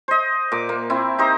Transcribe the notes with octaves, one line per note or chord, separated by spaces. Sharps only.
C5 D#5
A#2 D6
A#3
C4 E4
D#4 G4 C5 A#5